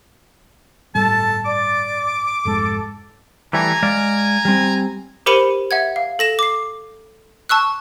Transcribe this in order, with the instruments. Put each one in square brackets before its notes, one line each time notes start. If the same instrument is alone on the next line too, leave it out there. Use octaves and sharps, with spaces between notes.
[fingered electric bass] G1 A2 G3 [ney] A4 [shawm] A5
[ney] D5 [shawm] D6
[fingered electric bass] F1 G#2 G#3 [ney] A4
[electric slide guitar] E3 G3 A3 [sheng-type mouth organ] G#5 A#5
[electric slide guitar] G#3 D5 F5
G3 C4
[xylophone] G4 A#4 C5 B5 C#7 D#7
E5 F#5 G#6
F5
A4 A#6 E7
D6 C7
A5 C#6 E6 F#6